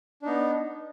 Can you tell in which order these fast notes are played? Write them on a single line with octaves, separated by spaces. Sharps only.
D4 D#4 B3